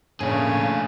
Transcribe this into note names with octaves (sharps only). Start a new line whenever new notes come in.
A2 C#3 A3 A#3 C#4 D4 G#4